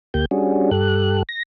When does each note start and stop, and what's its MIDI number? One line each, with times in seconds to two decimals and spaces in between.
0.14 0.25 38
0.14 0.25 58
0.14 0.25 67
0.14 0.25 91
0.31 0.70 55
0.31 0.70 61
0.31 0.70 62
0.31 0.70 66
0.31 0.70 68
0.71 1.23 43
0.71 1.23 67
0.71 1.23 69
0.71 1.23 90
1.29 1.43 94